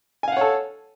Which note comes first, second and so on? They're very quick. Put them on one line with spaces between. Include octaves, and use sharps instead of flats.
G#5 F5 F#5 C#5 A4